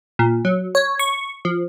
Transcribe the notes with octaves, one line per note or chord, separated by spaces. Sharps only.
A#2
F#3
C#5
C#6
F3